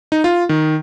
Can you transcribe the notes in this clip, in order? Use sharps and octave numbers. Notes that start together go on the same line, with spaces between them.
D#4
F4
D#3